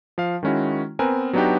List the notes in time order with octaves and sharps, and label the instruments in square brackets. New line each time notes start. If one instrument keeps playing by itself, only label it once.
[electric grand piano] F3 F5
D#3 G#3 C#4 E4 F#4
B3 C4 A#4 B4 G#5
F#3 B3 D4 D#4 F#4 G4